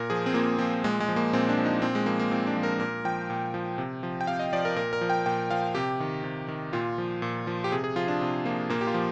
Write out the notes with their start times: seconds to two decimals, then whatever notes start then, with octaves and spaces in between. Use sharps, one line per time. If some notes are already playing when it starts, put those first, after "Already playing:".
Already playing: A#2 A#4
0.10 F3 G#4
0.26 C4
0.34 A#2 A#3
0.59 F3 C4
0.84 A#2 G#3
1.00 G#3
1.09 F3
1.16 A#3
1.33 A#2 C4
1.49 D4
1.58 F3
1.65 D#4
1.82 A#2 C4
1.95 G#3
2.06 F3 A#3
2.19 A#3
2.31 A#2 C4
2.47 D4
2.56 F3
2.63 A#4
2.80 A#2 A#4
3.05 F3 G5
3.30 A#2
3.54 F3
3.78 C3
4.03 F3
4.21 G5
4.27 C3 F5
4.39 D#5
4.53 F3 D5
4.65 A#4
4.76 A#2 A#4
4.93 A#4
5.01 F3
5.10 G5
5.26 A#2 G5
5.51 F3 F5
5.75 C3 G4
6.00 D#3
6.24 C3
6.48 D#3
6.73 A#2 F4
6.98 F3
7.22 A#2
7.47 F3
7.64 G4
7.72 C3 G#4
7.84 G#4
7.96 F3 F4
8.08 D4
8.21 C3
8.45 F3 A#3
8.70 A#2 A#3
8.81 G4
8.87 F4
8.94 F3